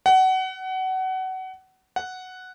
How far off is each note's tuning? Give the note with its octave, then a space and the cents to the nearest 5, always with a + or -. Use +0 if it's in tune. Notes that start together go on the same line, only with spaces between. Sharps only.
F#5 +25
F#5 +0